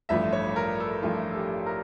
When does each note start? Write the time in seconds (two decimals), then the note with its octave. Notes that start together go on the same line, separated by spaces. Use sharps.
0.09 A1 G2 F3 A3 E5
0.33 C#5
0.56 A#4
0.80 A4
1.03 A1 G2 F3 A3 F4
1.31 A4
1.35 G4
1.66 A#4